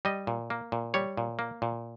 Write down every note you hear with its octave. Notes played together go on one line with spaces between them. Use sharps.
G3 D#5
A#2
A#3
A#2
G3 C#5
A#2
A#3
A#2